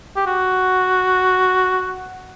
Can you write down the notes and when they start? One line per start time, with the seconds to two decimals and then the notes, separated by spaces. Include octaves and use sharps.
0.16 G4
0.27 F#4